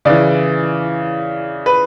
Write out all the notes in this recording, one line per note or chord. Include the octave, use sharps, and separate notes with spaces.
C#3 E3 D5
B4